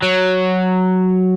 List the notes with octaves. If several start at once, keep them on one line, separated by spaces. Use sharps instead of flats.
F#3